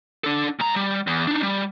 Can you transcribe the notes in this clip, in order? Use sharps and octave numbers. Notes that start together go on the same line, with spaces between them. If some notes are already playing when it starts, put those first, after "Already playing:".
D4 A4
G#2 A#5
G3
E2
D4 D#4
G3